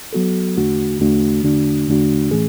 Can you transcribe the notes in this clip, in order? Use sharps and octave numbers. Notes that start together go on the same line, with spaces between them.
F#3 B3 F#4 A4
E2 D3 A3 D4 F#4
E2 D3 A3 D4 F#4
E2 D3 A3 D4 F#4
E2 D3 A3 D4 F#4
A2 E3 A3 C#4 G#4